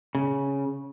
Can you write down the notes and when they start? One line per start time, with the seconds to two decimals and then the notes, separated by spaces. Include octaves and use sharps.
0.15 C#3